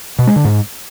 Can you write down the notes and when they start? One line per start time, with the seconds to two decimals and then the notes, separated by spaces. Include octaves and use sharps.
0.19 B2
0.27 G#3
0.36 D3
0.45 G#2